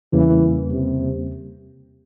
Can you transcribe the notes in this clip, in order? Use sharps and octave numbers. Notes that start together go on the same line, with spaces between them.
E2 C#3 E3 G3 A#3
C3